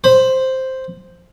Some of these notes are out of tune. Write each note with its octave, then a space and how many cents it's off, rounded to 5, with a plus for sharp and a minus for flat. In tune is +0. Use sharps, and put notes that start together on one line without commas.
C5 +0 B5 +15